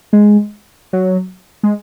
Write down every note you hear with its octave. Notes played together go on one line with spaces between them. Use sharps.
G#3
F#3
G#3